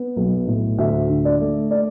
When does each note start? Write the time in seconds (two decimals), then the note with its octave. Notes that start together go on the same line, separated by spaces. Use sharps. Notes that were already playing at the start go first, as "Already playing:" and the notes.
Already playing: B3
0.16 B1
0.47 A2
0.78 D2 E5
1.09 D3
1.25 D5
1.40 A3
1.71 D5